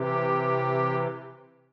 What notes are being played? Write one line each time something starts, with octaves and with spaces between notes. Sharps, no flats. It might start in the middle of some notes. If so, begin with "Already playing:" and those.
Already playing: C3 E3 G4